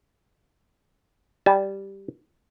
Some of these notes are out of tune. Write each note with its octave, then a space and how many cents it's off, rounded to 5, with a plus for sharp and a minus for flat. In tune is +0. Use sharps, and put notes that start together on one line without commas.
G3 +0 A5 -35